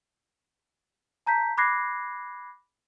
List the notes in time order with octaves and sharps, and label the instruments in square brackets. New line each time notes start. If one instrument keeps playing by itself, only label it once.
[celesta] A5 A#5 G6 B6
B5 D6 F#6 G#6 A#6 C7